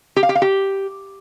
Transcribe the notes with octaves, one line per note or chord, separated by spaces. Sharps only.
G4
F5
G4
F5
G4